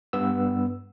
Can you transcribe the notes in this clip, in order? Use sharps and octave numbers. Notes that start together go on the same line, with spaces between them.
G2 B3 E6